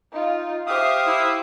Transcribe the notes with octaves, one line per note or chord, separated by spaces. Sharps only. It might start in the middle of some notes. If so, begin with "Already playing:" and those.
D#4 F4
G4 C5 E5 F5 D#6
E4